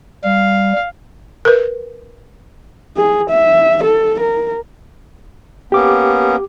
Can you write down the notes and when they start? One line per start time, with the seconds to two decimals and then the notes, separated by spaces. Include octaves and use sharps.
0.24 G3 F5
1.45 A#4 B4
2.96 G#4
3.30 E5
3.84 A4
4.20 A#4
5.72 A#3 B3 C#4 G4 D6